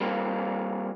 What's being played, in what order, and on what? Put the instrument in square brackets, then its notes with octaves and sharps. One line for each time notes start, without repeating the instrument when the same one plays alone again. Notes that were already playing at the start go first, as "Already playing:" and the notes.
[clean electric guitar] G3 A#3 C4 F4